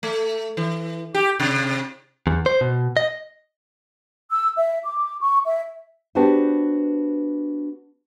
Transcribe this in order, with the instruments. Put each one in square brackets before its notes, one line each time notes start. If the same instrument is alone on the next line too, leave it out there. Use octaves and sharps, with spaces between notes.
[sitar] A3
E3
G4
C3
[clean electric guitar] E2
C5
B2
D#5
[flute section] E6
E5
D6
C#6
E5
[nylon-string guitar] B3 D4 F#4 G4 B4 C5